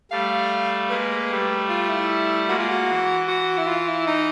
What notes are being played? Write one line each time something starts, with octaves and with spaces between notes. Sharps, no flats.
G3 A3 F5
G#3 A#3 B4
G3 A3
F4
E4
G#3 A#3 F#4
F4
F#4
E3
F#4
E4
F4
E4
D#4